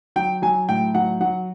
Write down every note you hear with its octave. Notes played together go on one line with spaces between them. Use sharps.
F#3 G5
F#3 G#5
A2 G5
F#3 F#5
F#3 F#5